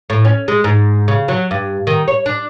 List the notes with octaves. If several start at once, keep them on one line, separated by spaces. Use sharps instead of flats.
A2
C#4
G#3
G#2
C#3
F#3
G2
D#3
C#5
D4